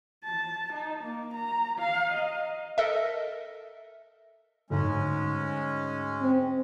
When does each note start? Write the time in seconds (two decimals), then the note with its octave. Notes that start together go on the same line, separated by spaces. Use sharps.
0.25 A5
0.73 D#4
1.04 A#3
1.34 A#5
1.79 F5
2.12 D#5
2.78 A4 A#4 D#5 E5
4.70 D2 G#2 G#3 C#4
6.21 C4